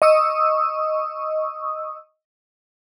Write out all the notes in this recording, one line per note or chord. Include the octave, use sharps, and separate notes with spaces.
D#5 C#6 D#6 E6